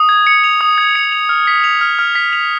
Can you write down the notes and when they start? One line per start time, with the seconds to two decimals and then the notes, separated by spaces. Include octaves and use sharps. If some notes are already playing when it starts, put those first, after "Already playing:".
Already playing: D#6
0.09 G#6
0.27 C#7
0.44 F7
0.61 D#6
0.78 G#6
0.95 C#7
1.12 F7
1.29 F6
1.47 B6
1.64 F7
1.81 F6
1.99 F6
2.15 B6
2.33 F7